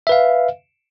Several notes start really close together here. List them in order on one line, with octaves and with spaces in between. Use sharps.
E5 B4 F5